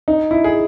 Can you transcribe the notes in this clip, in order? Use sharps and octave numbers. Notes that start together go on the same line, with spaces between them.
D#4
E4
G#4